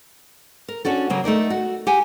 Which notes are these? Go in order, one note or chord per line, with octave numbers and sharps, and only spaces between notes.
A#4
C#4 D4 F#4 A4
C#3 F#3 A#3
A3 D#4 A#4 D5
F#4
G4 F#5 G#5